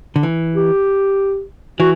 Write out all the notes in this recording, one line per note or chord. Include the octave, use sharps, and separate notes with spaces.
D3
E3
G4
E3 F#4